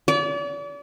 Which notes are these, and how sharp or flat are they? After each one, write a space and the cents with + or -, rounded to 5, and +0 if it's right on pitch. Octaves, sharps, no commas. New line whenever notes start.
D5 -40